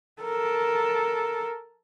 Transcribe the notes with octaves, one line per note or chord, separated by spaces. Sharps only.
A4 A#4